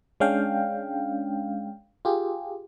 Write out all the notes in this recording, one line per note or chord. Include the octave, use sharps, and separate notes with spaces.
G#3 C#4 D4 F5 G5
F4 G4 G#4